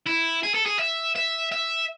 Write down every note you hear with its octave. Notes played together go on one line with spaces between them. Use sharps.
E4
G#4
A4
G#4
E5
E5
E5